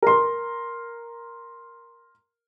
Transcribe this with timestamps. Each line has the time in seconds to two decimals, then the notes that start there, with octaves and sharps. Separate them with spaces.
0.02 A#4 C6